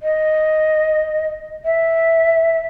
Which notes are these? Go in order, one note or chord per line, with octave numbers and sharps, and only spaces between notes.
D#5
E5